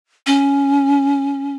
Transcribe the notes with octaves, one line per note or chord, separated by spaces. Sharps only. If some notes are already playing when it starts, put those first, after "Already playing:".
C#4